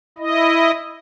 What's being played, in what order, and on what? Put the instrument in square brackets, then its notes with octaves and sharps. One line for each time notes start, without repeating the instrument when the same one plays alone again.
[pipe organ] E4 D#5